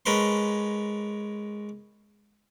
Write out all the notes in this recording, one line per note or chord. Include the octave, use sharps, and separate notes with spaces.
G#3 C#4 A#4 B4 A5 C6